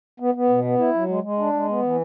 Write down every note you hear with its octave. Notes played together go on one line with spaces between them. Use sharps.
B3
B3
B2
B3
E4
F#3
G#3
G#3
D4
G#3
B3
E3